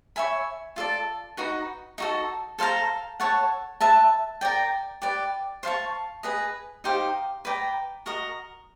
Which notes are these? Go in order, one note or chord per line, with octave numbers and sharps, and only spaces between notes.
C#5 E5 G#5 B5
F4 A4 D5
D#4 F#4 B4
D#4 F#4 A4
A4 C5 F5 A#5
A4 C#5 F#5 A5
B4 E5 A5
A#4 D5 G5
G4 B4 D5
C5 F5 A5 C#6
G#4 B4 D#5
D#4 G4 C5 F5
B4 D5 G5 A#5
F#4 A#4 D#5